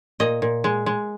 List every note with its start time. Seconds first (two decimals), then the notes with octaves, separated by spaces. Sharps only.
0.20 A#2 D#5
0.42 A#2
0.64 G#3
0.86 G#3